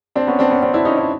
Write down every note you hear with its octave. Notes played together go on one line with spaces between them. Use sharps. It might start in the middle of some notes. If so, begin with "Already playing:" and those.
C4 D4
B3 C#4
C4 D4
B3 C#4
C4 D4
D4 E4
C#4 D#4
D4 E4